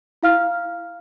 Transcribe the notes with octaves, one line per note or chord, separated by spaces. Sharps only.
E4 F5 F6